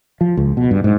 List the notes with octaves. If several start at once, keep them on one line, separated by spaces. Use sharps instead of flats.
F3
C#2
B2
G2
G#2